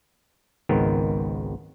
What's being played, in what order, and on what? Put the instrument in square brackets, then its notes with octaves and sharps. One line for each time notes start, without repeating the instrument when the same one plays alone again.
[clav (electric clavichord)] G#1 C#2 D#3 B3 C4 A#4